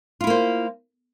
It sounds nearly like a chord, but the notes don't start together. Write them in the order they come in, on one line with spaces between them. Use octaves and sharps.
F4 E4 A#3 C5